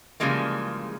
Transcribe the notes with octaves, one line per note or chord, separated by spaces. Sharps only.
C#3 E3 F3 G3 G#3 A#3